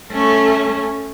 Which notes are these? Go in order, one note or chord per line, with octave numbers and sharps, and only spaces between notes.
A3 C#4